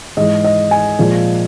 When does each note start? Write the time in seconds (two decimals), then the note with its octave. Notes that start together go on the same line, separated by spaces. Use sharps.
0.17 G#2 E3 G#3 D#5
0.44 D#5
0.71 G#5
0.99 A#2 F3 G#3